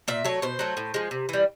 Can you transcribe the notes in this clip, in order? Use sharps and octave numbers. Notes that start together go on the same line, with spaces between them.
A#2 E5
F#3 A3 C#5
B2 C5
F#3 A3
A2
F3 G#3
C3
E3 G3